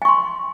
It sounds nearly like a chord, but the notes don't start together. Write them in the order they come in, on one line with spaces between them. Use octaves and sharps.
G#5 C#6 C6